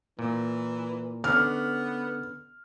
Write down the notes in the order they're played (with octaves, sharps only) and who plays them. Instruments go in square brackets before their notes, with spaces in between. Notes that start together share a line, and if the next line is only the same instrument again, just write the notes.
[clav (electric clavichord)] A#2 [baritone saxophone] E3
[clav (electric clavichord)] D3 C#4 [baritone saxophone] B3 [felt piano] F6